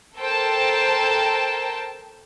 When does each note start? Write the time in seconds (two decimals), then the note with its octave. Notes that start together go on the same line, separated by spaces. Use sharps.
0.18 A4 A#4 C5 G5 A5